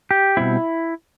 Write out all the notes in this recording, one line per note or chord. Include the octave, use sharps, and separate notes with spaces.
G4
B2 G3 C4 E4